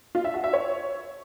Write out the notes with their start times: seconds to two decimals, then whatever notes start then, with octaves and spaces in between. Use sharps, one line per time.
0.15 F4
0.24 E5
0.34 F#4
0.44 E5
0.53 C#5